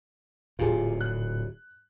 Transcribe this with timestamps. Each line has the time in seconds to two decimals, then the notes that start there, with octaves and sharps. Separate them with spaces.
0.59 D1 A#2 F4 G4 G#4
1.01 F#6